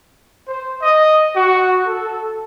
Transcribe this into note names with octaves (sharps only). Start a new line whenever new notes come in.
C5
D#5
F#4
A4